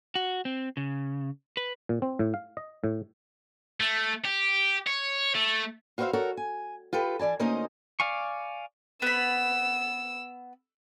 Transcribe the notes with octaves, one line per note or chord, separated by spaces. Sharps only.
F#4
C4
C#3
B4
A#2
C4
A2
F5
D#5
A2
A3
G4
C#5
A3
F4 F#4 B4 C5 E5 F5
F#4 A4 A#4 C#5
G#5
F4 G4 A4 B4
E3 D5 G#5 A5
D2 A#3 C#4 D#4 C5 D#5
D5 F5 G#5 C#6
B3 B5 E6